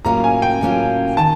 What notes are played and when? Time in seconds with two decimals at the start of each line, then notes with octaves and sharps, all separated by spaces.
0.04 A2 F#3 A#3 C#4 F4 A#5
0.24 G#5
0.42 G5
0.61 A2 F#3 A#3 C#4 F4
1.17 D#3 A5